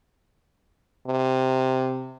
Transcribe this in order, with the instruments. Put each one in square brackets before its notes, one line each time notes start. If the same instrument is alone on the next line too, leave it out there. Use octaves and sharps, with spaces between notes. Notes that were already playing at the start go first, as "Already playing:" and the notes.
[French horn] C3